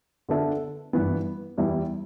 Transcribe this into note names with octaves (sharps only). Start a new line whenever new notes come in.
D3 B3 D4 A4 E5
G2 E3 B3
E2 E3 G3 E4